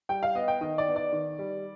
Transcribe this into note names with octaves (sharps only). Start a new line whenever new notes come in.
G3 G5
F5
B3 D#5
G5
D#3 D#5
D5
B3
D5
D#3
G3